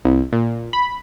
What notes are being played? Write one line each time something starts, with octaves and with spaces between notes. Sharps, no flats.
C2
A#2
B5